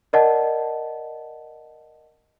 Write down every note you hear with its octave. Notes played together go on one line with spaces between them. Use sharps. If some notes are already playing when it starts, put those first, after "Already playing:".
A#4 D5 D#5 F#5 A5